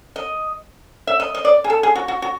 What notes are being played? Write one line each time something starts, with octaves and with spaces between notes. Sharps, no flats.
D#5
E5
D#5
D#5
D5
G#4
A4
G#4
F#4
F#4
F#4